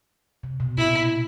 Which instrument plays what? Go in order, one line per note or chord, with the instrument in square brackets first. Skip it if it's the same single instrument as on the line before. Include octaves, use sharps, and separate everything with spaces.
[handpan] C3
B2
[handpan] A#2 [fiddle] E4